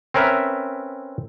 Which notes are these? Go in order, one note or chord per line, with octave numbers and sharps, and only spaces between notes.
C4 C#4 A#4 B4 E5 A#5